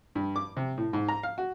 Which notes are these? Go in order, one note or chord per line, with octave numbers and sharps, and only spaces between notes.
G2
D6
C3
A2
G#2
A#5
F5
F#4